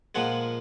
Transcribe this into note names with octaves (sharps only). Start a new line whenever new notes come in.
A#2 F3 G#3 F#5